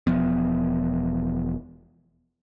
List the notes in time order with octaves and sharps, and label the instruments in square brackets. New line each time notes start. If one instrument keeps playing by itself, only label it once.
[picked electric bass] E1 F3 B3